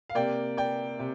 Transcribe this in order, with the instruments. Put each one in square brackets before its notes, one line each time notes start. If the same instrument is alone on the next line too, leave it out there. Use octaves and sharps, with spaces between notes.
[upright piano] F5
C3 A#3 D5 G5
D5 G5
C3